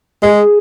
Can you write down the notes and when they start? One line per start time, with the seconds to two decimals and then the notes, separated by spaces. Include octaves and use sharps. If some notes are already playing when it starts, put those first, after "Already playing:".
0.23 G#3 G#4